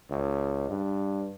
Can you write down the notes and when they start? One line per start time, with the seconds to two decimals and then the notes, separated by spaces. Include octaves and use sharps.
0.11 C#2
0.69 G2